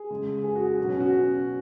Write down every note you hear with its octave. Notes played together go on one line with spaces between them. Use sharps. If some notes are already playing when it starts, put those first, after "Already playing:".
Already playing: G#4
C#3 G#3
G#4
F#4
G#4
B2 F#3 F#4
C#4
F#4
C#4